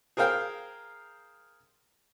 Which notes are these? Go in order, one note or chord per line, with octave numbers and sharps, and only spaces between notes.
G#4 A#4 C5 F5 G5